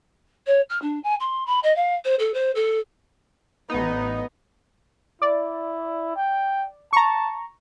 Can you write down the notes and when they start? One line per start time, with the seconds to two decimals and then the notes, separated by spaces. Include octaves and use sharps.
0.47 C#5
0.70 F6
0.82 D4
1.04 G#5
1.20 C6
1.46 B5
1.63 D#5
1.76 F5
2.05 C5
2.19 A4
2.34 C5
2.55 A4
3.70 A1 B3 D#4
5.22 E4 D5
6.16 G5
6.93 A5 A#5 C#6